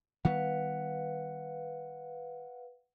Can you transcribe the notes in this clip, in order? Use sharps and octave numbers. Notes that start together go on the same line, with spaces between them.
D#3 G3 B3 B4 F5 F#5